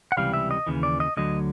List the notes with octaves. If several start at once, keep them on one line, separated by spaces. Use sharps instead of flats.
F#5
C#2 C3 E3 G3 F5
E5
D#5
D#2 C#3 E3
D5
D#5
D2 D3 F#3 D#5